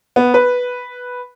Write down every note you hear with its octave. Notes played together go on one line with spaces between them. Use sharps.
B3
B4